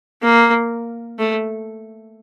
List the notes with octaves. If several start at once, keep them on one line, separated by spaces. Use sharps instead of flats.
A#3
A3